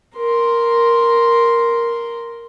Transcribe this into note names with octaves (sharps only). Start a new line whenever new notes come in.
A#4 C6